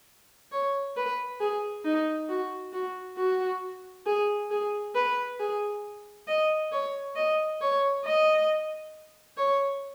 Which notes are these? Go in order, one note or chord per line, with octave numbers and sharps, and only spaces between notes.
C#5
B4
G#4
D#4
F#4
F#4
F#4
G#4
G#4
B4
G#4
D#5
C#5
D#5
C#5
D#5
C#5